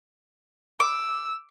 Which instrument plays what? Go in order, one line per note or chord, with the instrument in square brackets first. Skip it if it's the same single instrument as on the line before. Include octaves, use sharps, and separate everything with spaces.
[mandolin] D6 [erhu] E6